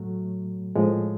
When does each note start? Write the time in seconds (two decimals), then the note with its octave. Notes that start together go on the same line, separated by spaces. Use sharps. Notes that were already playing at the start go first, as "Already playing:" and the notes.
Already playing: A2 F#3 A3
0.75 A2 F3 G#3